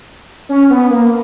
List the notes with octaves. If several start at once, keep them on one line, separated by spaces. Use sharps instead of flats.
C#4
B3
A#3